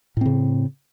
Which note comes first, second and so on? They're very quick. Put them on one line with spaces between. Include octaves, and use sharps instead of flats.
A2 C4 C#3